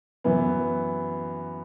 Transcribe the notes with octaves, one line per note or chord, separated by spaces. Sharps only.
F#2 E3 B3